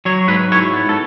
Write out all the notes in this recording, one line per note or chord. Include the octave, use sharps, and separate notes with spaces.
F#3 C#5
G#2 B4
E4 C#5
B3
A4